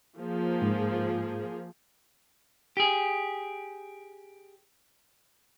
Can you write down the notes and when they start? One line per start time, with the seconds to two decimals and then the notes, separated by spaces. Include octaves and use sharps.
0.19 F3 A#3 G#4
0.62 G#2
2.77 G4 G#4